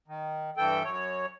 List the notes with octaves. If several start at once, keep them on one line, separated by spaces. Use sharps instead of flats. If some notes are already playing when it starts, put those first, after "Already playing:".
D#3
G2 E3 A4 G5
F#2 C#5